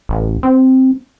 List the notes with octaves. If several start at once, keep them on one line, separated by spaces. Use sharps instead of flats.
A1
C4